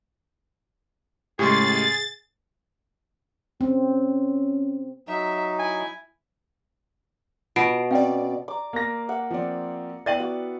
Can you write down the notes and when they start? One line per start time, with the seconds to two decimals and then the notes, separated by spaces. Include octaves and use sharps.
1.39 A2 C#3 G#3 G4 G#4 C6 A6
3.61 C4 C#4
5.08 F#3 D#4 E5
5.59 E4 G#5
7.56 B2 F4 C7 D7
7.91 C4 C#4 D5 F5 G5
8.48 D5 A#5 D6
8.73 A#3 A#6
9.09 E5 F#5
9.31 F3 C4 D5
10.06 B3 E4 D5 E5 G5 A6 D#7 F#7
10.19 F#4 F#5 D6